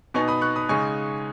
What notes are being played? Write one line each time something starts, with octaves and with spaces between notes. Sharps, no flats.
B2 B3 D#4 G#5 C#6
B5 D#6
C#6 F#6
B5 D#6
C#3 G#3 D#4 G#5 C#6